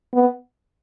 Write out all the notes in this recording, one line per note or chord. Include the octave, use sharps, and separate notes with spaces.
B3